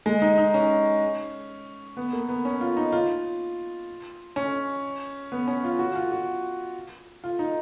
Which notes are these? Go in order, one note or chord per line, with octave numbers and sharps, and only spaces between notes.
G#3
D#4
D#4
C#4
B3
A#3
B3
C#4
F4
D#4
F4
C#4
B3
C#4
F4
F#4
F4
F#4
F4
D#4